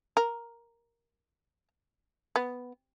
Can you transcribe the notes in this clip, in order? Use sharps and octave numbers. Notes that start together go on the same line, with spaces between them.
A#4
B3